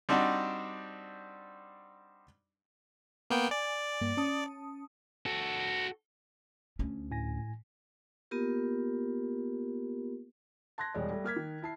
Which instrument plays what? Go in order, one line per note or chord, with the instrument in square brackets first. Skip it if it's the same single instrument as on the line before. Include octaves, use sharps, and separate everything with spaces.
[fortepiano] G3 C4 D4 D#4 F#4
[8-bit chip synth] A#3 B3 G5
[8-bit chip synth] D5 [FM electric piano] G#5
[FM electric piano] G2 A#3
C#4 A5 D#6
[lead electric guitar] F#4 A4
[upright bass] D2 C#4
[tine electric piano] A2 G#5 A#6
[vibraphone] A#3 B3 F4 G4 A#4
[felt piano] A5 C6 F#6 G#6 A#6
E1 G3 G#3 C#5 D5
G3 A3
A#3 F6 G#6 B6
D#3
E4 A5 C7